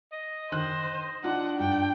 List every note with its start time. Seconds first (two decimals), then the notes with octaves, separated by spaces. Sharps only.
0.12 D#5
0.52 D#3 C5 F#6
1.24 D4 D#4 F4 F#5
1.59 G2 G5